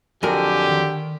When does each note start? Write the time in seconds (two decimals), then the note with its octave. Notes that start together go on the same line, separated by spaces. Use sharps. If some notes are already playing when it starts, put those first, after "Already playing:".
0.23 F2 D3 F#3 G4 A#4 G#5
0.69 D#3